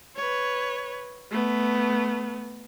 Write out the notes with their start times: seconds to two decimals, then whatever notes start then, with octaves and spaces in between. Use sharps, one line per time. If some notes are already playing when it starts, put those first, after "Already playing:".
0.16 B4 C#5
1.31 A3 B3